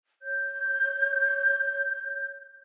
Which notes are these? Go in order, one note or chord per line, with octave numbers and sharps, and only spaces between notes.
C#5 G6